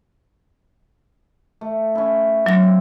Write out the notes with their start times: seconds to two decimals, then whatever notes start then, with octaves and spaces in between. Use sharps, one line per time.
1.61 A3
1.95 C#4 E4
2.46 F#3 D6 A#6
2.59 C4 F5